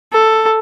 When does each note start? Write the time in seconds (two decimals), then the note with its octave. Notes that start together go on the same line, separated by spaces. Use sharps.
0.12 A4